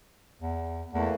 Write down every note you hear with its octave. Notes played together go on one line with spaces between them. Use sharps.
E2
E2 E3 A3 A#3